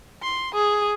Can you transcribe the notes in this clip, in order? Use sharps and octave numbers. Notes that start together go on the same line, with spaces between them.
C6
G#4